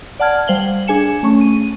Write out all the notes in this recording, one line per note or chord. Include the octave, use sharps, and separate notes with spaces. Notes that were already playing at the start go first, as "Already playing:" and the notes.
D5 F#5 A5 F6 G#6
G3 C5 F5 F#7 G7
D4 G#4 G#5 C#7 E7
A3 C#4 C#6
D#7